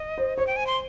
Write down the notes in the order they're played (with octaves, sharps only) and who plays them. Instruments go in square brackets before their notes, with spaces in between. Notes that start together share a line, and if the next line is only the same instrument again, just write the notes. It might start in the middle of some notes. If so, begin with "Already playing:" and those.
Already playing: [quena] D#5
[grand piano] C5
[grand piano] C5 [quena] C#5
[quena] G5
G#5
C6